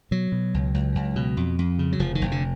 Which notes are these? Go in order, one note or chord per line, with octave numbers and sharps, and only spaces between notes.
B2 F#3
B2
C#2
C#2
C#2
B2
F2
F2
C#3
F#3
F1 F3
D#3
F1
D3